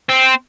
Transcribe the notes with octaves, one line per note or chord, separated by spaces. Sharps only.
C4